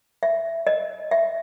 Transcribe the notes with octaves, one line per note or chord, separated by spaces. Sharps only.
E5
D#5
E5